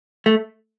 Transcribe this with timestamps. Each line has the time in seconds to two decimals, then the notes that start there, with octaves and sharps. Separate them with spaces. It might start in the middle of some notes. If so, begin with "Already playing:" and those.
0.26 A3